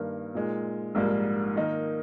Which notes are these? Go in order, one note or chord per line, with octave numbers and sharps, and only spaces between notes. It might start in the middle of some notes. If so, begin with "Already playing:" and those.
Already playing: G2 D#3 A#3
A#2 G#3 D#4
A#1 G#2 G3 A#3
D#3 A#3 D#4